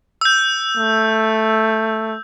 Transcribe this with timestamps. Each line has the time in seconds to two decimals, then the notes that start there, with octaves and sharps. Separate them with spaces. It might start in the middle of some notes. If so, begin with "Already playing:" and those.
0.21 E6 G6
0.77 A3